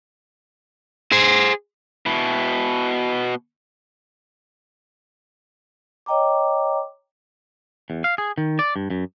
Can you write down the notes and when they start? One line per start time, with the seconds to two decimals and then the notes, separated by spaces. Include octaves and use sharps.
1.12 G#4 C5
2.06 B2 E4
6.06 C#5 D#5 G5 A#5 D6
7.90 E2
8.04 F5
8.18 G#4
8.38 D#3
8.59 D5
8.76 G2
8.90 F#2